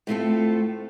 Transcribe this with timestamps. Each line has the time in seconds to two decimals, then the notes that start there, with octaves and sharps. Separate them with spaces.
0.07 A2 A3 C4 F4 A4